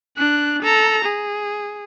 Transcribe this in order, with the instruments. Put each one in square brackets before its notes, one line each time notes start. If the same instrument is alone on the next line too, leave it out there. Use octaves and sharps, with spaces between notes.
[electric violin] D4 F#6
A4 A#5
G#4